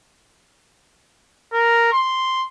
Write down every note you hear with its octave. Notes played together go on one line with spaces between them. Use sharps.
A#4
C6